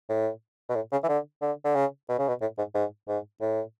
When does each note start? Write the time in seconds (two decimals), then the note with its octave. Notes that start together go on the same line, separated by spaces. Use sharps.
0.09 A2
0.69 B2
0.75 A2
0.92 C#3
1.03 E3
1.08 D3
1.41 D3
1.64 D3
1.75 C#3
2.09 B2
2.19 C#3
2.28 B2
2.41 A2
2.58 G#2
2.74 G#2
3.08 G#2
3.41 A2